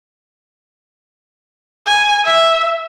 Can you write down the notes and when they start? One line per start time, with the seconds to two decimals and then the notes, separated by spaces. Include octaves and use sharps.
1.87 G#5
2.25 E5